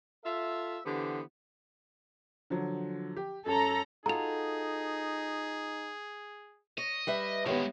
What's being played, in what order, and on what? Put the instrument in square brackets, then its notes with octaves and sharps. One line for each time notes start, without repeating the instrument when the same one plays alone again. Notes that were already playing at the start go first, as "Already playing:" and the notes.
[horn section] F4 A4 E5
D3 E3 B3 G4 C5
[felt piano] D3 F3 F#3
G4
[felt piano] F#2 C#4 [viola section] A4 A#5
[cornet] D#4 [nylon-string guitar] F4 F#4 A4 [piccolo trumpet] G#4 [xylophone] A#5 F7
[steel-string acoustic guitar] C#5 [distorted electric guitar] D#5
[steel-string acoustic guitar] G3 B4 E5
[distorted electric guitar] D3 G#3 [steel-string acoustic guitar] D#3 [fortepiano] B3 G4 C#5